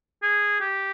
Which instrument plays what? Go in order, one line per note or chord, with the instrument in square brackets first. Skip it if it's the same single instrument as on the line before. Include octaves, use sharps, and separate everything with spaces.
[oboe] G#4
G4